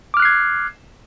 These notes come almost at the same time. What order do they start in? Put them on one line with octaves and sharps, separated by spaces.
D6 F6 F#6 C7 G#6